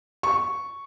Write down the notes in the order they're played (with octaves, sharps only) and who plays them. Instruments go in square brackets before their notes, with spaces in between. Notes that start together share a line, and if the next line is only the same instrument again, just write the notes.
[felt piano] C#6